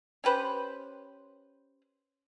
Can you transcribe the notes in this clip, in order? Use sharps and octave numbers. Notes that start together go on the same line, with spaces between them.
C#4 G4 B4 C5